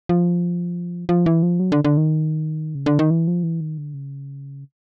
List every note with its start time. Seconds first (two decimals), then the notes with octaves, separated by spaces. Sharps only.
0.09 F3
1.09 F3
1.26 E3
1.43 F3
1.60 F#3
1.72 D3
1.84 D3
1.97 D#3
2.75 C#3
2.86 D3
2.99 D#3
3.11 E3
3.28 F3
3.43 E3
3.61 D#3
3.78 D3
3.94 C#3